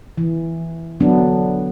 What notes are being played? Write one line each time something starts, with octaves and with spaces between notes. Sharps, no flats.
E3
D3 F#3 B3 D4